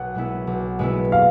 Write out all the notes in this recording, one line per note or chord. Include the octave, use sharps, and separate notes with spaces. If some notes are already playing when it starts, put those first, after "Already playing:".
Already playing: B1 F#5
B2 G#3 B3 E4
B1
B2 G#3 B3 E4
F5